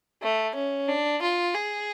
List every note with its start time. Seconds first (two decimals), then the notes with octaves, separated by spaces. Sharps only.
0.22 A3
0.55 C#4
0.89 D4
1.22 F4
1.55 G#4